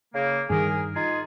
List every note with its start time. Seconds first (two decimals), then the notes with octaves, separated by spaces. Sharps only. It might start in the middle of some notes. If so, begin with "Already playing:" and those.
0.15 C#3 A#3
0.50 G2 D#3 G#4 A#4
0.96 D#4 F4 G#4